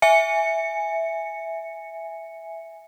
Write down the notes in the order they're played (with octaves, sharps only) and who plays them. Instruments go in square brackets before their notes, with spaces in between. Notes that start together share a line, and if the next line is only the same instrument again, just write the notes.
[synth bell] E5 G#5 C#7